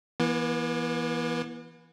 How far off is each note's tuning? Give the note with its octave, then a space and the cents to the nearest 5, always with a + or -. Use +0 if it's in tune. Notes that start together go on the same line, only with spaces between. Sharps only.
E3 +5 B3 -45